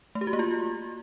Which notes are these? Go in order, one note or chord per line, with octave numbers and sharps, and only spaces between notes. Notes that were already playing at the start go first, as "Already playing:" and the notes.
A3
G4
F#4
A#3
F4